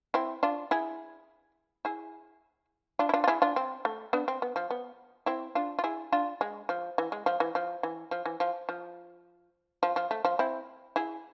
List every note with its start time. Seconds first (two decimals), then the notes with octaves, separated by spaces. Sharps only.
0.14 C4 E4
0.43 D4 F4
0.71 E4 G#4
1.85 E4 G#4
2.99 D4 F4
3.09 E4
3.14 D4 F4
3.24 F4
3.28 E4 G#4
3.42 D4 F4
3.56 C4
3.85 A3
4.13 B3 D4
4.28 C4
4.42 B3
4.56 F3
4.70 B3
5.26 C4 E4
5.55 D4 F4
5.79 F4
5.84 E4 G#4
6.12 D4 F4
6.41 G#3
6.69 F3
6.98 E3
7.12 G#3
7.26 F3
7.40 E3
7.55 F3
7.83 E3
8.11 F3
8.26 E3
8.40 F3
8.69 F3
9.83 F3
9.96 F3
10.11 A3
10.25 F3
10.39 C4 E4
10.96 E4 G#4